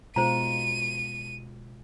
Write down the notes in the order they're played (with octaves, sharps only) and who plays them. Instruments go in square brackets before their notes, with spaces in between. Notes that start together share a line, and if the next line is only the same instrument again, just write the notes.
[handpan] B2 G#3 F4 [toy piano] C5 A#5 [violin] D#7